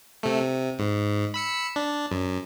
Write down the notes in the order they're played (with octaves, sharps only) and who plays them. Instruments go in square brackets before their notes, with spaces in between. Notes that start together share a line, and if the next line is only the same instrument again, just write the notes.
[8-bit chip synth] C3 A3
C3
G#2
B5 E6 C#7
D4
F#2